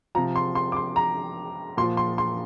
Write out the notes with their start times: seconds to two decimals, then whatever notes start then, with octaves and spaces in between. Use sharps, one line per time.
0.15 F3 A#5
0.18 C3
0.36 C6
0.55 C6
0.72 D6
0.76 C6
0.96 A#5
1.77 A#2 C6
1.81 F3
1.97 C6
2.18 C6